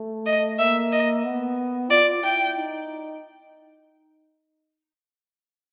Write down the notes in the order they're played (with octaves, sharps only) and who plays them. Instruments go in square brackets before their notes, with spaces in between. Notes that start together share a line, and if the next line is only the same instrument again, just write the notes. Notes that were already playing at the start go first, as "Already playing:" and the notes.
Already playing: [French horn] A3
[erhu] D#5
[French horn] A#3 [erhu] E5
[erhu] D#5
[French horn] B3
[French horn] F4 [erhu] D5
[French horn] E4 [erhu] G5
[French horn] D#4